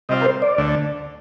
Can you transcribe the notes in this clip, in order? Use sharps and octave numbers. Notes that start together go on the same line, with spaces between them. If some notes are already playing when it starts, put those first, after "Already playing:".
C3 G3 C4 F4 D#5
A#4
C5
D5
D2 D3 A3